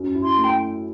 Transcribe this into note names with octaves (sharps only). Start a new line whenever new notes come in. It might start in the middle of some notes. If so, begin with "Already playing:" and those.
Already playing: F#2
E4
C6
A3
G5